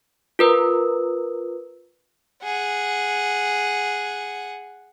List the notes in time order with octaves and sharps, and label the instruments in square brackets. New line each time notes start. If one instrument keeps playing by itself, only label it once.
[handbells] F4 A#4 B4
[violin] G#4 F#5